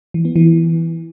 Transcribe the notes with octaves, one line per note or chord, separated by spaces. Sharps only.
E3
B3
E3